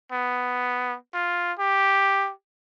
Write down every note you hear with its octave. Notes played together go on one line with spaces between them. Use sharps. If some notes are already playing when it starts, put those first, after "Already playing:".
B3
F4
G4